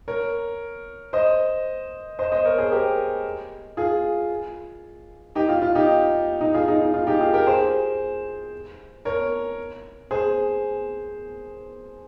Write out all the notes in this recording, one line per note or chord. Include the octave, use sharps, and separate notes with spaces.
A#4 C#5
C5 D#5
C5 D#5
C5 D#5
A#4 C#5
G#4 C5
G4 A#4
F4 G#4
D#4 G4
F4
F4
D#4 G4
D#4
F4 G#4
D#4
D#4
F4
D#4 G4
F4 G#4
G4 A#4
G#4 C5
A#4 C#5
G#4 C5